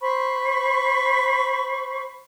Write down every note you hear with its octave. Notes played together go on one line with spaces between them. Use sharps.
C5 B5 C#6